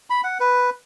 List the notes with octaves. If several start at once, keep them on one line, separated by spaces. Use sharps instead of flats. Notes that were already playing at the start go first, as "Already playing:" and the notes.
B5
F#5
B4